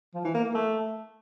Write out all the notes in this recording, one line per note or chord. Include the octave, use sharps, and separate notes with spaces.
F3
E3
A#3
A#3
A3